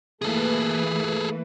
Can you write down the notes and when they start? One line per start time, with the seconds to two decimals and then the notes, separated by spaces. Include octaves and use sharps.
0.22 E3 A3 A#3 G#4 A4 B4